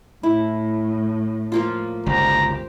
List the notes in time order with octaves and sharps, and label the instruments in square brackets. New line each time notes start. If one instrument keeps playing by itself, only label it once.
[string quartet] A2 [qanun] E4
[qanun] F3 A#3 F4
[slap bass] G1 C#2 [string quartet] G4 C5 [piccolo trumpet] A#5